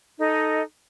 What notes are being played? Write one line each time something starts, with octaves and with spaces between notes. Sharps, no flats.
D#4 A4 D#5